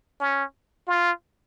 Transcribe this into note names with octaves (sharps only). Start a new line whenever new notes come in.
C#4
F4